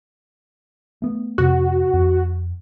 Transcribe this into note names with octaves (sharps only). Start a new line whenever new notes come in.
A3 B3
F2 C3 F#4
F2